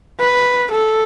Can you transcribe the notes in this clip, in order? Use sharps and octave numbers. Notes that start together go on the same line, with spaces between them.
B4
A4